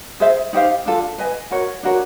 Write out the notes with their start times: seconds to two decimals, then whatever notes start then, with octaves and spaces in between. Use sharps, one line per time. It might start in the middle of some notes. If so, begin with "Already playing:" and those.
0.20 G#4 C5 E5
0.53 D#4 G4 C5 F5
0.86 D4 F4 A4
1.18 B4 D#5 G#5
1.51 F#4 A#4 C#5
1.83 D4 F#4 A#4 C#5